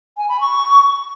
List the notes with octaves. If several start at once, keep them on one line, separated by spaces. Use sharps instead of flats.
G#5
B5
C#6